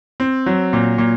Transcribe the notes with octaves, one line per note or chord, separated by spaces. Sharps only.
C4
F#3
A#2
A#2